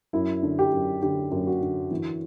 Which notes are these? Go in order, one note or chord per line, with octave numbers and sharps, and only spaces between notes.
F#2 E4
D3
G4
F#2
D3 G4
F#2
F#4
D3
E3